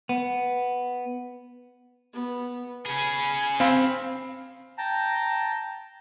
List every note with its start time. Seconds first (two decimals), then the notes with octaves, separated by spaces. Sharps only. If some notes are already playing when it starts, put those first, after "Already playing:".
0.09 B3
2.13 B3
2.85 C#4 G#4 G#5 B5
3.60 C4 F5 B5
4.78 G5 A5 A#5